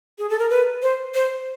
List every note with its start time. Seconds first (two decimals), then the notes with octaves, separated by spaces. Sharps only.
0.19 G#4
0.30 A4
0.39 A#4
0.50 B4
0.82 C5
1.14 C5